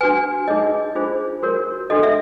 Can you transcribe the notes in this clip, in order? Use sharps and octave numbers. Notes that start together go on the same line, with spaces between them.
D4 F#4 B4 G#5
D#4 G#4 C#5 D#5
D4 F4 G#4 C5
F#4 A#4 C#5
D4 F#4 A4 D#5
E5